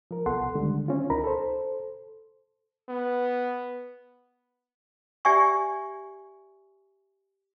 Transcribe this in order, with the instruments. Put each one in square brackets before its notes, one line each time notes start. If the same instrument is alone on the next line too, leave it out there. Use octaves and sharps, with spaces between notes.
[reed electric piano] F3 A#4
C2 B3 A4 F#5 C6
D3 D#3 G3 G#3
C4 C#4 F4
C#2 D#4 A#4 A#5 B5
A4 C5
[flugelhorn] B3
[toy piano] G4 D5 E5 G#5 C#6